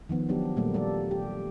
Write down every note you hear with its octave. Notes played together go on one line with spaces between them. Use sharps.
D#3 F3 B3
F#3 B3 D4 G4
A#2 G3 A3 A#3
G3 A4 D5
G4